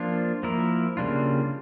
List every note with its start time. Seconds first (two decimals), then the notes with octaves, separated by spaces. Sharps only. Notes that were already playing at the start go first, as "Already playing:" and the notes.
Already playing: F3 A#3 D4 F4
0.43 F3 A#3 E4 A#4
0.97 C#3 G3 A#3 D4 F4